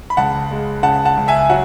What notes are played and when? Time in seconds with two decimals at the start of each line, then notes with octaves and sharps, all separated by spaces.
0.10 B5
0.17 C#2 F#5 A5
0.51 G#3
0.83 C#3 F#5 A5
1.05 F#5 A5
1.17 C#2
1.28 E5 G#5
1.50 F#3 F#5